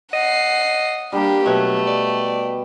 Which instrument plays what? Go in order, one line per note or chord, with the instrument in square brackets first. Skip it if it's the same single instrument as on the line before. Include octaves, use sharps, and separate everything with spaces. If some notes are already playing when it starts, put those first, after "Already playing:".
[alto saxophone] D#5 [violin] F#5 C7
[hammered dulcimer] G3 A#3 [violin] D4 G4
[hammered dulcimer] B2 [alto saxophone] F#3 [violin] A3
[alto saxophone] D5